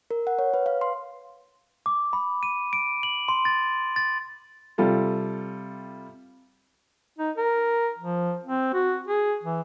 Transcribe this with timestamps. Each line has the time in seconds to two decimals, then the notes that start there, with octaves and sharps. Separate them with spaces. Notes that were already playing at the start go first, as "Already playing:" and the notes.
0.11 A#4
0.27 F#5
0.39 C#5
0.54 B4
0.66 F5
0.81 C6
1.86 D6
2.13 B5
2.43 D#7
2.73 D7
3.03 F#7
3.28 C6
3.45 A6
3.96 A6
4.78 C3 G3 F4 A4
7.19 D#4
7.37 A#4
7.99 F3
8.44 C4
8.74 F#4
9.08 G#4
9.43 E3